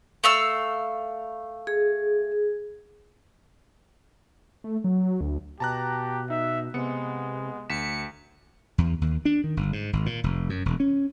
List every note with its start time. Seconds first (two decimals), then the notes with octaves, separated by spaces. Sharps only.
0.24 A3 F5 E6
1.67 G#4
4.64 A3
4.84 F#3
5.21 D2
5.60 B2 G4 A5 A#5 F#6
6.30 D#4 E5
6.74 C3 G#3 B3 C#7
7.70 D2 B6 C#7 E7
8.78 E2
9.01 D#2
9.25 D4
9.44 D#3
9.57 G1
9.73 G#2
9.93 G#1
10.06 A#2
10.24 F1
10.50 F#2
10.66 E1
10.80 C#4